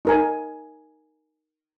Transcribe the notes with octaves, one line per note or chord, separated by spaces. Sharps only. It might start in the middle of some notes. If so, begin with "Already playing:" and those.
D#4 A#4 G#5